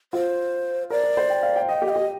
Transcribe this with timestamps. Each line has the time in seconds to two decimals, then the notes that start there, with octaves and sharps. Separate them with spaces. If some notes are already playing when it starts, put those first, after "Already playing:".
0.13 F4 C5
0.90 A#4 D5
1.04 A#4
1.17 C5
1.30 G5
1.43 F5
1.56 G5
1.69 D#5 G5
1.82 G4
1.89 D#5
1.96 G4